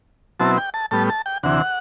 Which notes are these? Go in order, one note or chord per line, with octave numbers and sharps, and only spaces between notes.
B2 F#3 C4 E4 A5
G5
A5
A2 G3 B3 A5
A5
G5
D2 C3 E3 F#5